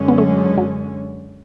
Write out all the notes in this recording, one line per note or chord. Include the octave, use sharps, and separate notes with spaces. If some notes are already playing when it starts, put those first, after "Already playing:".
Already playing: F#2 D3 G#3 C#4
B3
A3
F#3